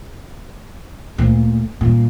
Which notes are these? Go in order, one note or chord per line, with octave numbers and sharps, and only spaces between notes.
D2 A#2
G2 A#2